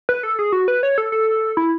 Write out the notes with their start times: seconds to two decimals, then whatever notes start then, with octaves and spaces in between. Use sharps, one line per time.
0.09 B4
0.23 A4
0.39 G#4
0.52 F#4
0.68 B4
0.83 C#5
0.98 A4
1.12 A4
1.57 E4